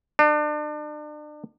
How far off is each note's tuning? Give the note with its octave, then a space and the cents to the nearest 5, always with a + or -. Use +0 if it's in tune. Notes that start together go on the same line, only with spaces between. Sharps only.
D4 +35